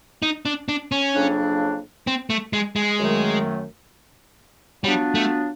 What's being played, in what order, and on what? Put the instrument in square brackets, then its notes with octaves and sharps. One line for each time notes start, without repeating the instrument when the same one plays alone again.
[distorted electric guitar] D#4
D4
D4
C#4
[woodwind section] F2 C#3 F#3 A#3 D4
[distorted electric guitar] C4
A3
G#3
G#3
[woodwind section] F#2 D#3 F#3 A3
[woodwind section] F#3 B3 D4 F4 [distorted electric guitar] G3
[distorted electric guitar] A3